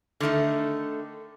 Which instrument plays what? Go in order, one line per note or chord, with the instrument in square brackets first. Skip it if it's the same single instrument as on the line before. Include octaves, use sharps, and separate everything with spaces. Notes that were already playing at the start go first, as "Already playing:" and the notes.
[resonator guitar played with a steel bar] D3 D#3 A3 D#4